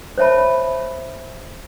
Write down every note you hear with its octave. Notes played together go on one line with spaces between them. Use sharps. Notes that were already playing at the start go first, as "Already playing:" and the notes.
C5 C#5 E5 A5 B5